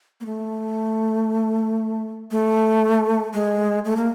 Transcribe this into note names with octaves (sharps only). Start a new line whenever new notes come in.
A#3
A3
A3
G#3
A3
A#3